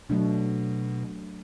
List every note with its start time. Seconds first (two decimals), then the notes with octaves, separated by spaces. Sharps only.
0.09 B2 F#3 A3 D4